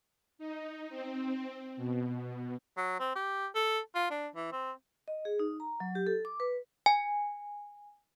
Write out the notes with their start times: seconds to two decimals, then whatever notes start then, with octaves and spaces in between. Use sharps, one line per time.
0.39 D#4
0.90 C4
1.77 B2
2.77 F#3
3.00 C4
3.16 G4
3.55 A4
3.95 F4
4.10 D4
4.35 E3
4.52 C4
5.08 D#5
5.25 G#4
5.39 D#4
5.60 A#5
5.80 F#3
5.95 G4
6.07 A4
6.25 D6
6.40 B4
6.86 G#5